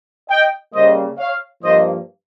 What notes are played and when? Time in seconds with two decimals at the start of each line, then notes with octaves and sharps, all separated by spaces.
0.29 D#5 G5
0.74 C#3 G3 A#3 C5 D#5
1.18 C#5 F5
1.63 G2 F3 A#3 C5 D#5